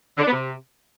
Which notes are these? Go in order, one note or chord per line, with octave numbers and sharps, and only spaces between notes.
D3
D4
B3
C3